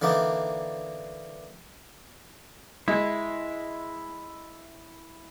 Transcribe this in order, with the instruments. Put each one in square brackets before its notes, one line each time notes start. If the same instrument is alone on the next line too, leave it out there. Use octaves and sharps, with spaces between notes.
[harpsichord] D3 E3 A#3 D4 D#4
[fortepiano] G#3 [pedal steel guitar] E4